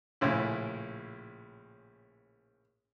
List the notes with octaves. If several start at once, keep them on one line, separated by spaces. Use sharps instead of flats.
A#1 A2 C#3 E4